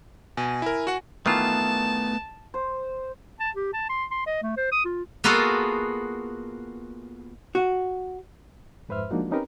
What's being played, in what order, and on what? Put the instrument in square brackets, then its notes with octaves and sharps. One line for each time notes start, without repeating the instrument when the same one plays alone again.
[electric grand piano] B2 [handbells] G#5
[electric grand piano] E4 A#4
F#4 F#5
[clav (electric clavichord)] D#3 E3 F4 [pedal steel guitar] A3 B3 [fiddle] A5
[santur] C5
[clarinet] A5
G4
A5
C6
C6
D#5
A3
C5
D#6
F4
[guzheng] A#3 B3 F4 F#4 G#4 A4
[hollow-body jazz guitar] F#4
[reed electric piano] F2 G#2 B4 C5 E5 F6
F3 G#3 A#3 D4 D#4 F#4
C4 C#4 D#4 G4 A#4 B4